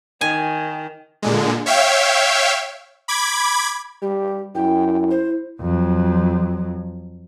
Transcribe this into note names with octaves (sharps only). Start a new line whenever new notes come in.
D#3 G#5
A#2 D3 G#3
C#5 E5 F5 G5
B5 D6 G#6
G3 G4
F#2 E4 G5
C5
F2 F#3